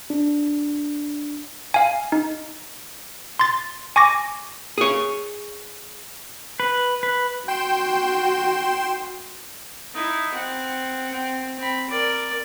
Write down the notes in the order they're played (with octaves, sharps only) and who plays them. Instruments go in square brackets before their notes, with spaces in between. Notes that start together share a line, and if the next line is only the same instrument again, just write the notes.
[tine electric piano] D4
[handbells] F5 G#5
D#4
C6 A6
G#5 C#6 D6 A#6
[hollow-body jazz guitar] G#4 C#5
[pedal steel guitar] B4
B4
[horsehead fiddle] F#4 [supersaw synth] G5 C6 E7
[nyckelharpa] D#4 E4
C4 F#5
C4
C4 B5
A#4 D5